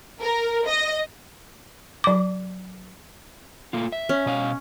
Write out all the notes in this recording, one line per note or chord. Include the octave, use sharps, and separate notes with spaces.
A#4
D#5
F#3 D6
A3 A#3 F4
E5
C#4
B2 D#5 F5